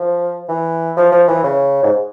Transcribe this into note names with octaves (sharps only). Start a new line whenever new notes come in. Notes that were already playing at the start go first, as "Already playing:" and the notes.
Already playing: F3
E3
F3
F3
E3
C#3
G#2